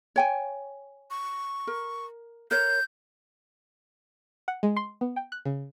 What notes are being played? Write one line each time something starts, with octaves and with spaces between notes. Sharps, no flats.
C#5 G5 G#5
C#6
A#4
A#4 C#5 G6
F#5
G#3
C6
B3
G5
F#6
C#3